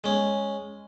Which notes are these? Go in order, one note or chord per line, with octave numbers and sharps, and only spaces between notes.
G#3 C#4